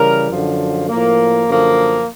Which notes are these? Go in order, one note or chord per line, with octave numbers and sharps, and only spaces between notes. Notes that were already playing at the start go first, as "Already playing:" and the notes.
Already playing: C#3 E3 G3 A#4
F#2 D3 F3
A2 F3 A#3
F#2 D3 F3 A#3